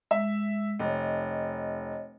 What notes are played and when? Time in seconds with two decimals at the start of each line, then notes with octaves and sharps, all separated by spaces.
0.11 G#3 E5
0.79 F1 C#5 D#5